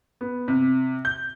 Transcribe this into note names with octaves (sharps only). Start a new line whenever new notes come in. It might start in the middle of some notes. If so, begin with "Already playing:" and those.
B3
C3
G6